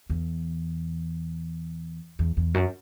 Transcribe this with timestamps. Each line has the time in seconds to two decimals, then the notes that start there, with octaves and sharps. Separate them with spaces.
0.10 E2
2.19 E2
2.37 E2
2.54 F#2